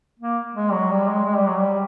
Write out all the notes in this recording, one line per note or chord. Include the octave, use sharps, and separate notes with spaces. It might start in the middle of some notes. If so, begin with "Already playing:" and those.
A#3
G#3
F#3
G3
G#3
G#3
G3
F#3
G3